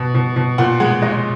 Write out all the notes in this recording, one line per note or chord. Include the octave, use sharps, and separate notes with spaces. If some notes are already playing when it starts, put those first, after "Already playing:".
Already playing: B2
B2
B2
A#2 F#5
G#3 F#5
G#3 D#5